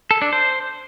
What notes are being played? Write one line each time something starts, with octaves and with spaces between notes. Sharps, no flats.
A4
D4
C5